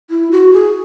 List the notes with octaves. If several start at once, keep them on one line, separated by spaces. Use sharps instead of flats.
E4
F#4
G#4